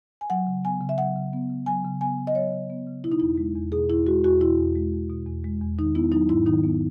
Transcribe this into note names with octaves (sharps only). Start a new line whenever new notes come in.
G#5
F#3 F#5
C#3
B3 G#5
C#3
E5
F#3 F#5
C#3
B3
C#3
F#3 G#5
C#3
B3 G#5
C#3
D#5
F#3 C#5
C#3
B3
C#3
B2 E4
D#4
E2 E4
G#3
E2
B2 G#4
E2 E4
G#3 F#4
E2 F#4
B2 E4
E2
G#3
E2
B2
E2
G#3
E2
D#3 D#4
B3 E4
F#3 D#4
G#2 E4
D#3 D#4
B3